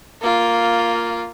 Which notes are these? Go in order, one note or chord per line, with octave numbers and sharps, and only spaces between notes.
A#3 F4